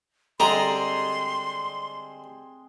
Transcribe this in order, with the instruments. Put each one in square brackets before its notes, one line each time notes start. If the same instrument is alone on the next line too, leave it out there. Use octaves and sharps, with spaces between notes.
[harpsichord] D3 G3 G#4 [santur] G#3 C4 [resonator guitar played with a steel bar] A#5 [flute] C6